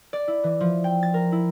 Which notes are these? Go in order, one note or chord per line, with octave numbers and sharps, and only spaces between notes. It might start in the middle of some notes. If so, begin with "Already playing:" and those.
D5
E4
E3
F3
G5
A6
A#4
E4